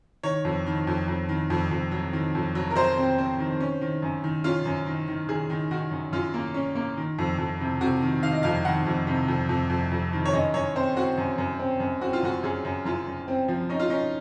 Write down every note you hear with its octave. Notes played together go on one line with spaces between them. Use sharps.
D#3 C#5
F2
D#3
F2
F2
D#3
F2
F2
F#3
D#3
F2
F#3
A#4
F#3 C5
C4
C4
D#3
C#4
D#3
F#2
D#3
C#4 F4
F#2
D#3
D#3
D#3 G#4
D#3
D#3 F#4
F#2
F#2 F4
A#3
C#4
A#3
D#3
F2
F2
C3
C3 F#4
D#3
D#3 F5
D#5
F2 F5
D#3 F#5
F2
C3
F2
F2
F2
F2
D#3
C#5
F#2 D#5
F#2 C#5
C4 C5
C4 F#4
F#2
F#2
C4
F#2
C4 F#4
F4
F#2 F#4
F#2 G#4
F#2
F#2 F4
F#2
C4
F3
C#4 D#4
F4
C#4 D#4